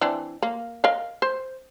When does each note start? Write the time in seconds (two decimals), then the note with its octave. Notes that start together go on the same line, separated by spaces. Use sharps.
0.01 E3 C4 D4
0.42 A#3
0.84 A#4 D#5 F5
1.22 C5